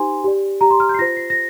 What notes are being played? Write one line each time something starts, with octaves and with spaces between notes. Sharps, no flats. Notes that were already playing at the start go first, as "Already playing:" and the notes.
Already playing: D#4 G4 C5 G#5 C6
G4 D5
G4 D5 A#5
C6
F6
G6
C7
F4 C5 A#6
C7
A#6